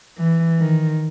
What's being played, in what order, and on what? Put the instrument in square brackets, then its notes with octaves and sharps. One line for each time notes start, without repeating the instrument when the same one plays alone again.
[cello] E3
D#3